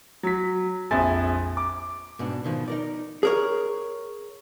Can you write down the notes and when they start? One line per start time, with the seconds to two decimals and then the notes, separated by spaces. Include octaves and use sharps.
0.23 F#3 B6
0.91 A#1 F2 G#4 E5 G#5 A6
1.57 D6
2.19 G#2 B2 D4
2.44 B2 D#3 F3
2.68 D#4 A#4 D5
3.23 G#4 A#4 C#5